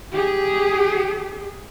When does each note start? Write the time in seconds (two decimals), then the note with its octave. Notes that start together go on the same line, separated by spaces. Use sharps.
0.12 G4 G#4